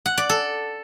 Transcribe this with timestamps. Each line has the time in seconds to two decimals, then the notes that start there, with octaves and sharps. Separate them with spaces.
0.06 F#5
0.18 D5
0.29 A4